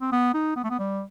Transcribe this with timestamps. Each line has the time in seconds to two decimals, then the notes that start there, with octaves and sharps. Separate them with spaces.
0.01 C4
0.12 B3
0.34 D#4
0.56 B3
0.64 A3
0.70 B3
0.79 G3